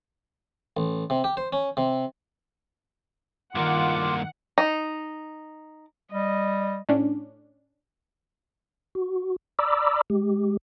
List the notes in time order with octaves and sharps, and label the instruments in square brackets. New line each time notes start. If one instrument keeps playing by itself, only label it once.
[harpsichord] A1
C3
G4
C5
C#4
C3
[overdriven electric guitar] G2 A#3 [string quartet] D#3 [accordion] F4 D6 [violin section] F#5
[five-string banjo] D#4
[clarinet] G3 [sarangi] D#5
[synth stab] A2 C#4 D4
[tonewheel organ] F#4
D5 A#5 B5 D6 E6
G#3 G4